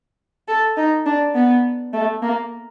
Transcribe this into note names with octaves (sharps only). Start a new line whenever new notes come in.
A4
D#4
D4
B3
A3
A#3